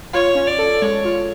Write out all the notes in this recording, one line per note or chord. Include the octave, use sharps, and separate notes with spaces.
F4 C#5
C#4
D5
A4
G#3 C#5
F4